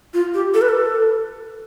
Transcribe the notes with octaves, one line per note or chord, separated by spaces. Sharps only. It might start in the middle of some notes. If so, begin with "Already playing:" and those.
F4
G4
A4
B4
A4